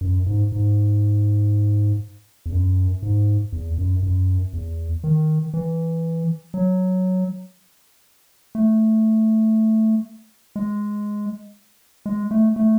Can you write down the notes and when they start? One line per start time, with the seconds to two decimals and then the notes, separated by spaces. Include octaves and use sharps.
0.01 F#2
0.26 G#2
0.52 G#2
2.46 E2
2.52 F#2
3.03 G#2
3.53 E2
3.78 F#2
4.03 F#2
4.53 E2
5.04 D#3
5.54 E3
6.54 F#3
8.55 A3
10.56 G#3
12.06 G#3
12.31 A3
12.56 A3